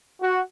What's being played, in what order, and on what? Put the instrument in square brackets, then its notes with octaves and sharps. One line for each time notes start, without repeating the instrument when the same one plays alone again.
[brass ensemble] F#4